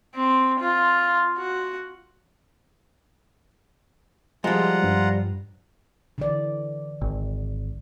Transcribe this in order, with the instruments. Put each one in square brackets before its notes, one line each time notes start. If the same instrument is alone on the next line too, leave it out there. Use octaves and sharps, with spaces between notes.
[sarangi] C4
F4
F#4
[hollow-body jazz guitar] F3 G3 [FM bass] G#3 [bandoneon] F4 F#5 A#5
[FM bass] G2
[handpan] D3 E3 D5
[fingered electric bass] G#1